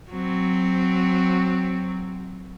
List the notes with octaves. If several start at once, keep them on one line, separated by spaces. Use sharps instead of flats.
F#3 C4